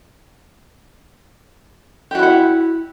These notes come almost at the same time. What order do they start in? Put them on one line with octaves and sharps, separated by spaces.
G4 F#4 E4 F#5